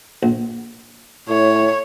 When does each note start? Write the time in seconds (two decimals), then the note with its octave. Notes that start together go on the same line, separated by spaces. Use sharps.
0.23 A#1
1.29 A2 C#5